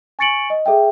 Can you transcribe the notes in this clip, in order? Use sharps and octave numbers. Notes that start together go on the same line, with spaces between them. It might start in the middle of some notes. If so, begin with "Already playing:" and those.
G#5 C#6 A6 C#7 D7 F#7
D#5
G#4 A4 E5 G5